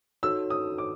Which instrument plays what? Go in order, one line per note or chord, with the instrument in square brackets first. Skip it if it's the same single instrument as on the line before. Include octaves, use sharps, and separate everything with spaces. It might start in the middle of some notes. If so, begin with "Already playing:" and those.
[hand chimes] D#4 F#4 A4 C#5 [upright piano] E6
[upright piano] D#6
D6